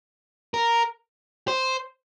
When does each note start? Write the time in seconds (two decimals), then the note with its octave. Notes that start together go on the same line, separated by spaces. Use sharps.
0.54 A#4
1.48 C5